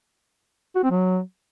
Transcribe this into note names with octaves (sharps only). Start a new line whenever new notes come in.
F#4
C4
F#3